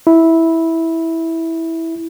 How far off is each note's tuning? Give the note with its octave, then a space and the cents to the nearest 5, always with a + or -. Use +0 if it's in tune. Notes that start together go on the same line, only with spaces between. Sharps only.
E4 -10